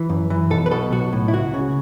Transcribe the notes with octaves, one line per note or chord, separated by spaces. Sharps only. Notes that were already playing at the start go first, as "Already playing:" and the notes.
Already playing: E3
F#2
E3
B1 A4
B4
B2 A4
B1 F#4
A2
E4
C#2 F#4
C#3